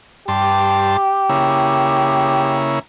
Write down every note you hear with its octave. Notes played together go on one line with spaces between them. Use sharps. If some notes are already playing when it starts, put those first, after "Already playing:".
G2 G4 A5 C6
C#3 A#3 E4